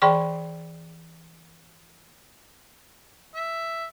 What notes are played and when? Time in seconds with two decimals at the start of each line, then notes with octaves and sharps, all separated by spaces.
0.02 E3 G#4 D5 G5 B5 C#6
3.35 E5